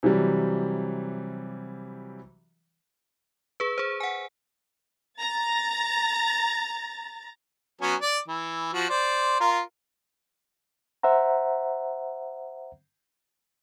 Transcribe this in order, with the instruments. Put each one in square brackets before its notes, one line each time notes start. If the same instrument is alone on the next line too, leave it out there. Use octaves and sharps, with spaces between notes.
[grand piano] C3 E3 F#3 G3
[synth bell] G#4 B4
G#4 C5
F#5 G#5
[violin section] A#5 A6
[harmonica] F#3 B3 C#4
D5
E3
F3 F#4
C5 D5
F4 A#4
[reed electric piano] C5 E5 F#5 A#5